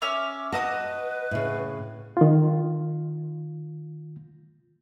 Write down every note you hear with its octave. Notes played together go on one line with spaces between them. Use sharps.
C#4 E5 D6 F6
F#4 B4 D#5 A5 D#6
A2 C#3
D#3 F4